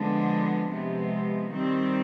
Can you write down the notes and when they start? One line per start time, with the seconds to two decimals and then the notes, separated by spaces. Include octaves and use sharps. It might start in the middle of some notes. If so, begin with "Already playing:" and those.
Already playing: D3 F3 G#3 B3 D4
0.70 C3 F3 G#3 B3
1.50 D#3 G3 C4